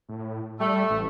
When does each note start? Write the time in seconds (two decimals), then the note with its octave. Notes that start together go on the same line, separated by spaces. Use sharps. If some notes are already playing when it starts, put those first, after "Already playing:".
0.09 A2
0.60 G3 A3
0.90 A1